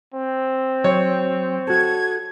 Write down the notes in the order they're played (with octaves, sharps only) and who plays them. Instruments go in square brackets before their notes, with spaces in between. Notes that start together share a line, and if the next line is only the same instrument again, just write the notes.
[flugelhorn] C4
[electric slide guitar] F#3 [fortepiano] C#5
[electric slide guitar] F#4 A4 [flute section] G#6